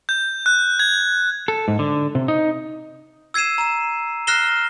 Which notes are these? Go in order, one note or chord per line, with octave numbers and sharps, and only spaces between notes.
G6
F#6
G#6
A4
G#2
D3
C3
D#4
E6 G#6 C7 D#7 E7
A#5 E7
F6 F#6 A#6 C7 E7 G7